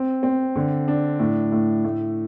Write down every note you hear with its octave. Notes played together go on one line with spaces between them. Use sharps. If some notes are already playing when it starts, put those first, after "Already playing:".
Already playing: C4
C4
D3
D4
A2
A2
A3